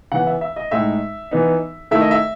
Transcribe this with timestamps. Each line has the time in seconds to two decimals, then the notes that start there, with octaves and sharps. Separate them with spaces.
0.12 C#3 E3 B3 F#5
0.27 E5
0.41 E5
0.56 D#5
0.71 A2 G#3 D#4 E5
1.31 E3 B3 D#4
1.91 D#3 A3 E4 E5
2.01 D#5
2.11 E5